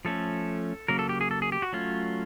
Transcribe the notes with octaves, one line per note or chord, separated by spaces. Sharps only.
F3 A3 C#4 A4
C#3 F#3 A#3 A#4
A4
G4
G#4
A4
G#4
G4
F#4
F#3 A3 C#4 F4